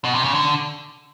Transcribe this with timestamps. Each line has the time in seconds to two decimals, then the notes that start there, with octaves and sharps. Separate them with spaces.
0.04 B2
0.15 C3
0.24 C#3
0.34 D3